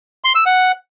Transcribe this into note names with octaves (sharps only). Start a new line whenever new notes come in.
C6
E6
F#5